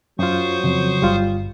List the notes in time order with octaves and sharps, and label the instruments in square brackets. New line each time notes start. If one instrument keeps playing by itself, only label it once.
[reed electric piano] F#2 F4 [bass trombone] F#3 [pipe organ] C5 C#6 D#6
[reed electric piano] F2 [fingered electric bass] C#3
[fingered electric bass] G1 [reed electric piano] G3 F4